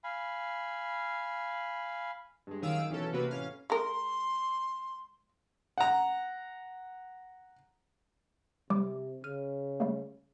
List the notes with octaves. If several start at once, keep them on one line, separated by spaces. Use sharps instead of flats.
F5 G#5 B5
G2 G#3
F#2 D#3 G#4 F5 E6 D7
B1 E3 C#4 A4
C3 A#3 F#4 B4
A1 C#4 F5
G#3 A#4 C6
F#5 A#5
C3 G3 D6
C#3 F6 D#7
G3 A3 A#3